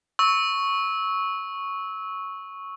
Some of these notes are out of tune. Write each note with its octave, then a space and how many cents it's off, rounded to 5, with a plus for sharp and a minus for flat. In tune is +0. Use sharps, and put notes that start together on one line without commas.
C#6 +0 E6 -25